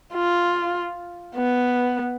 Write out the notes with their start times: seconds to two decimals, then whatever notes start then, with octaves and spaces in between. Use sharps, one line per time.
0.14 F4
1.36 B3